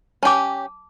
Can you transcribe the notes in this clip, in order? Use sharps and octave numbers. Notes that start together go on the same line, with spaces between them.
C#4 G4 A5 D6